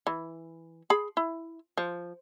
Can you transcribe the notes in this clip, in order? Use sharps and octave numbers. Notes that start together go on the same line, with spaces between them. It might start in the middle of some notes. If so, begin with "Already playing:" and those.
E3
G#4 B5
E4
F3